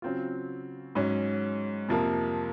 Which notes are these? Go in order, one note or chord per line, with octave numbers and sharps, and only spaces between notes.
C#3 F#3 C4 F4
G#2 F#3 C#4
F2 C3 F3 A#3